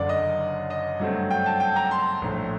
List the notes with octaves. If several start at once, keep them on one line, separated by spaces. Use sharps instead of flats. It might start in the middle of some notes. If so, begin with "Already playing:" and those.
Already playing: F#1 F#2 D3 D5
D#5
D#5
G2 F#3 A3 C4
G5
A5
G5
A#5
C6
A#1 A2 A3